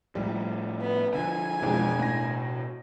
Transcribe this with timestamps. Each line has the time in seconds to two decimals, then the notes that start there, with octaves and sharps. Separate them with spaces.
0.15 A2 F3 G3
0.80 B3
1.14 D3 F3 G#5
1.62 F2 G#2 B2 E3 C4 D4
1.99 A2 A#6